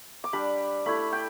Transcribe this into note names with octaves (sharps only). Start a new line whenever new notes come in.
D6
G3 D4 B5
A3 E4 B5
G5